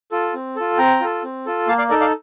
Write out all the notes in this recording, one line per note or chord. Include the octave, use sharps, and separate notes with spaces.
F4 A4
C4
F4 A4
C4 G5 A#5
F4 A4
C4
F4 A4
A#3 F5 A5
D5 F5
D#4 A4 A#4 D5
D5 F5